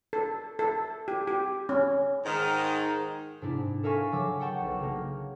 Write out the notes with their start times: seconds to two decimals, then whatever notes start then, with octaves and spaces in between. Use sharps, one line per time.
0.13 A4
0.59 A4
1.08 G4
1.28 G4
1.69 C#4
2.25 G#2 D#3
3.42 G#2 C3 D4 E4
3.83 A4 A#4 E5 F5 G#5 C#6
4.12 C#3 F#3 A5 D6 E6
4.40 F#5 G5 A5 C#6
4.61 B1
4.80 C#3 A#3